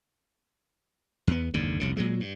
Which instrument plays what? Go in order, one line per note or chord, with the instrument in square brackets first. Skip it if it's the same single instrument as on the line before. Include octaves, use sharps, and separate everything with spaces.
[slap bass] E2 B3
F#1 D#2 G#2 D3
F1 C2 C#3
A#2 F#3 G#3
G2